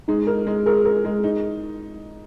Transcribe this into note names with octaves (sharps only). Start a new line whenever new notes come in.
G#3 D#4
A#4
G#3
G#4 A#4
A#4
G#3
D#4